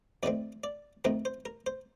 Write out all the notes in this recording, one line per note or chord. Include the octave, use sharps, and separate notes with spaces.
F2 D#3 A3 C4 D5
D5
F2 D#3 A3 C4 A#4
C5
A#4
C5